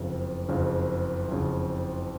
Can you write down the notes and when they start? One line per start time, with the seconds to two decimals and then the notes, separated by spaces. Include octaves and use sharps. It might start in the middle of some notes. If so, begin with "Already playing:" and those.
Already playing: F#1 F2 C#3
0.49 F#1 F2 C#3
1.28 F#1 F2 C#3